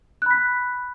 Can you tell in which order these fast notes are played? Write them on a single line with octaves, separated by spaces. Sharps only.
F#6 B5 B6